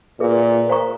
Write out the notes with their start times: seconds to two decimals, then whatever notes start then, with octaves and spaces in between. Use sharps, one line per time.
0.20 A#2 G#4 B4 E5
0.69 C5 F5 A#5 C#6